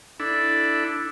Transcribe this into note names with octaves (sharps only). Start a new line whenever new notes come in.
D4 E4 A4